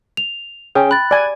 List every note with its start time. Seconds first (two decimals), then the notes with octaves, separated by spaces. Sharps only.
0.17 F7
0.75 C#4 G#4 G5
0.91 B5 F#6 A6
1.11 D5 G#5